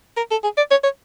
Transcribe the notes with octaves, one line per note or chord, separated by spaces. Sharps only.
A#4
A4
G#4
D5
C#5
C#5